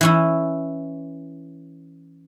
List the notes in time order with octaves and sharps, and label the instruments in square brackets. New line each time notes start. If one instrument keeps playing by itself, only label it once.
[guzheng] E3 C#4 E4